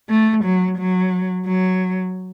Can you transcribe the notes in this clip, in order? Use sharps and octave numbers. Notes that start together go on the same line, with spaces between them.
A3
F#3
F#3
F#3